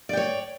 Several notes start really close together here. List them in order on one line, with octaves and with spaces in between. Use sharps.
D5 G5 C#5